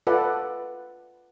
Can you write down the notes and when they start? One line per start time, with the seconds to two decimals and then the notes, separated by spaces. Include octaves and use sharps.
0.07 F4 A4 B4 D5 E5 F#5